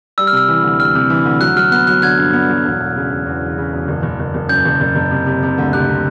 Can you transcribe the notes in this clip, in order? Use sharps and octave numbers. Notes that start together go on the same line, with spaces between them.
G3 E6
F6
C3 E6
E3
D2
G3 F6
C3
E3
D2
F#3 F#6
F#3 F6
B3 F#6
F#3 F#6
D3 F#6 G#6
G2
B3
F#3
E1
E1
C#3
E1
E2
E1
C#3
E1
F#1
F#1
F#1
F#1
F#2 G6
F#1
F#1
F#1
C3
C3
C3
D2
C3 F#6
C3